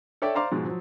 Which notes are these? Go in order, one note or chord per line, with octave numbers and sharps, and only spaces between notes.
A4 C#5 D5 E5 G5
C5 D5 F5 A#5 C6 D6
G#2 B2 F3 G#3
F3 F#3